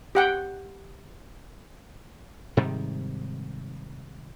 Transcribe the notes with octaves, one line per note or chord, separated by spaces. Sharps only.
G4 F#5 G5
G#2 C3 D#3 G3